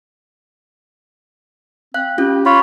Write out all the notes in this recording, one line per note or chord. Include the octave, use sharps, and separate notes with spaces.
C4 F5 F#6
C#4 F4 G4
F4 C#5 B5